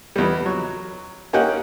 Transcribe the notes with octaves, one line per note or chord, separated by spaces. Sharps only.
E2 G3
F#3
A#3 C#4 D#4 G4 F#5